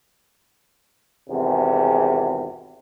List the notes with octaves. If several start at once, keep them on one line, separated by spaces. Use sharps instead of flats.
G#1 E2 C3